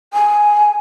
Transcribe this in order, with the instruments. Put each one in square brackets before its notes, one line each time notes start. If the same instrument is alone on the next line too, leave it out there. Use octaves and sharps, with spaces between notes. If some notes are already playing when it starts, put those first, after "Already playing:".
[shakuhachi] G#5